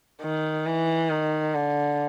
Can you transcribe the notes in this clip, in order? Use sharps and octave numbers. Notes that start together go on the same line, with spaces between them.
D#3
E3
D#3
D3